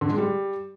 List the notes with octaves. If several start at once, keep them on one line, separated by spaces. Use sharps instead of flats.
D3
G#3
G3